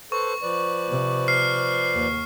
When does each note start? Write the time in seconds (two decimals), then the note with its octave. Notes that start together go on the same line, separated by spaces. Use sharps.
0.12 A4 B4 C5 C#6
0.43 F3 B4 D5
0.88 C3
1.28 F6 C7
1.94 D#2